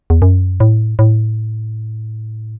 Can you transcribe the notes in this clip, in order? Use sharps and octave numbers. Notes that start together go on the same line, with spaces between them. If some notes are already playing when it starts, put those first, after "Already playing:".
E2
F#2
A2
A2